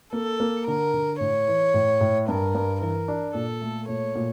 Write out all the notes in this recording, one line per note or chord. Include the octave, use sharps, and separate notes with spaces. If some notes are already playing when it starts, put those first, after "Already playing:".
A#3 A4
A#3
D3 A#4
D3
A2 C#5
E3
A2
A2
G2 A#4
G2
E3 A#4
D4
A#2 A4
A3
A#2 C#5
A#2